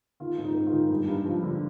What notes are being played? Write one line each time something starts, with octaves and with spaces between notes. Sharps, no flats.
D#3 F4
G#2
D#4
G#2
F4
D#3
G2
G2
F3
D3